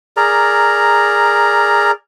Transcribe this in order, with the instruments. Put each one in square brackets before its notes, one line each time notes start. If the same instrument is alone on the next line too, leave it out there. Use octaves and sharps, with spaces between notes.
[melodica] G#4 A#4 D5 A#5